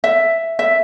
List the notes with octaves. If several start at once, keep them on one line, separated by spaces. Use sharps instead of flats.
E5
E5